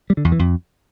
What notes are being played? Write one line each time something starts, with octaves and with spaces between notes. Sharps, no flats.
G3
D3
E2
E3
F2